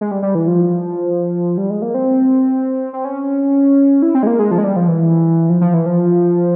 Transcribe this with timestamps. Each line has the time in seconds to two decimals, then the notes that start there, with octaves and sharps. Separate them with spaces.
0.01 G#3
0.11 G3
0.22 G3
0.35 E3
0.48 F3
1.57 G3
1.70 G#3
1.82 A#3
1.94 C4
2.93 C4
3.05 C#4
4.02 E4
4.15 C4
4.23 G#3
4.27 A#3
4.39 G#3
4.51 F3
4.58 G#3
4.64 G3
4.76 F3
4.88 E3
5.50 F3
5.61 F3
5.74 E3
5.86 F3